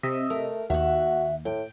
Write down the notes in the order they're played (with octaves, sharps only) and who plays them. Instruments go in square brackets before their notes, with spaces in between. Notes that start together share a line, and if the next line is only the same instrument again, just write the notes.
[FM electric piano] C3 D#5 E5
[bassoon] A3 [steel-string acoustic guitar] A#4
[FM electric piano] D#2 [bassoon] F#4 [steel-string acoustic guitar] E5 F#5
[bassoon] A2 [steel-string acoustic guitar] G5